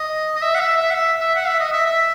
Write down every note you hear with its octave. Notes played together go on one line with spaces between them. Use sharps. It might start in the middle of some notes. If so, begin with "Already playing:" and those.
Already playing: D#5
D#5
E5
F#5
E5
E5
F#5
E5
E5
F#5
E5
D#5
E5
E5